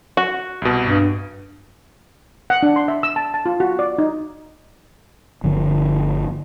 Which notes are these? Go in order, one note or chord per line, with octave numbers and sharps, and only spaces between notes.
F#4
C2 B2
G2
F#5
D4
C6
E5
E6
A5
A5
F4
F#4
D5
D#4
G1 D3 F3